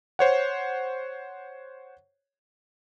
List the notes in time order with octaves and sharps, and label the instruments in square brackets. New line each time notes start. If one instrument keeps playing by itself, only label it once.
[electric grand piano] C5 C#5 F#5